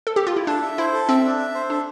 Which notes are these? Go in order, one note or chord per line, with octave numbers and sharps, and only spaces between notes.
A4
G4
F4
E4
D4 A4
E5
E4 C5
A4
C4 E5
D4
E5
C5
D4 A4